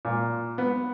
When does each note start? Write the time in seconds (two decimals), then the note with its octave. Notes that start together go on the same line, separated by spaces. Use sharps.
0.05 A#2
0.58 B3